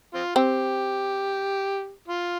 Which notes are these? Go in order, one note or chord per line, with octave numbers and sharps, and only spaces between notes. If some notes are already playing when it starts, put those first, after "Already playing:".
C4 F4
C4 G4
F4